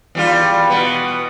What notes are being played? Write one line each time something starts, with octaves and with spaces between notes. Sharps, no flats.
E2 G3 F4
B2 B3